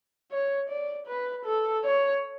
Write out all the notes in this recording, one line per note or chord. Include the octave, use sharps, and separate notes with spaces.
C#5
D5
B4
A4
C#5